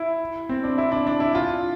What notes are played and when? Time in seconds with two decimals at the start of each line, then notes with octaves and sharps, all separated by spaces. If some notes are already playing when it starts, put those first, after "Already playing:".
Already playing: E4
0.49 C4
0.64 D4
0.78 E4
0.92 D4
1.07 D4
1.20 E4
1.35 F4